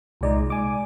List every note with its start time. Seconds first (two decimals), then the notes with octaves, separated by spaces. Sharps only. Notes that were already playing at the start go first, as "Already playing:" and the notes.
0.21 C2 A#2 G#3 D#4 D5
0.50 G#3 G#5 D6